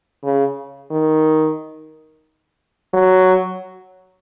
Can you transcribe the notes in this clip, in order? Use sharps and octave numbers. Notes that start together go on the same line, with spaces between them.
C#3
D#3
F#3